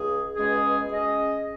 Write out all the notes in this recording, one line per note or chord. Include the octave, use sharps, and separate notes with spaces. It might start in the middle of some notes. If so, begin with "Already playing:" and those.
Already playing: C#2 G#4
C#2 B2 G#3 C#4 G#4
G#3 C#4 G#4 D#5